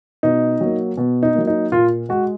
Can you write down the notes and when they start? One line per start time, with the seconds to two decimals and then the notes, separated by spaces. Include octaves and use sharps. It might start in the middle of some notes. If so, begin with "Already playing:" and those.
0.23 B2 D#4
0.61 F#3 A#3
0.97 B2
1.23 D#4
1.35 F#3 A#3
1.47 D#4
1.72 A#2 F4
2.09 G#3 F#4